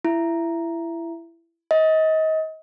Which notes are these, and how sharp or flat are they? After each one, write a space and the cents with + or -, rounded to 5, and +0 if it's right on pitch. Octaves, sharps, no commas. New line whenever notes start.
E4 +20
D#5 +30